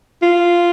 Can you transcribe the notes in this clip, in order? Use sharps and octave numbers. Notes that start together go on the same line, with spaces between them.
F4